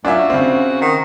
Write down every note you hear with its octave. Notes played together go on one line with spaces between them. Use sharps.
F#2 D4 F4 E5
F#4
C#3 C4
D#3